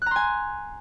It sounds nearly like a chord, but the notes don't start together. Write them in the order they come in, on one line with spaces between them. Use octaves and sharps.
F#6 A#5 C6 G#5